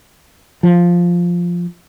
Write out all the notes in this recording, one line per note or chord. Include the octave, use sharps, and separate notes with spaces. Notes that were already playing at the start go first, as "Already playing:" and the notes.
F3